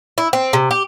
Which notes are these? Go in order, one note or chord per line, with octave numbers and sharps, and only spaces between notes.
E4
C4
C3
G4